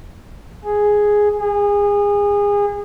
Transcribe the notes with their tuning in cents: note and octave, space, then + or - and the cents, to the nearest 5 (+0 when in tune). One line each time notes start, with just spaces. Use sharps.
G#4 +0
G#4 -30